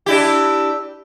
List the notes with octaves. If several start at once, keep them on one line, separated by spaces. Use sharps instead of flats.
D4 E4 G4